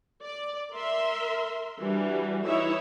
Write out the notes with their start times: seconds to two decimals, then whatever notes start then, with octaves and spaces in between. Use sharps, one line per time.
0.23 D5
0.73 A#4 E5 C6
1.79 E3 G3 D4 F#4
2.43 E3 D#4 E4 C#5 E5